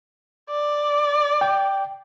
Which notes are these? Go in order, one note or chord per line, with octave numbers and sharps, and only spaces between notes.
D5
G5